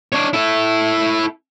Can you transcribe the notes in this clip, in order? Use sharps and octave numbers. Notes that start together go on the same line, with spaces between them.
D4 C#5
E4 A4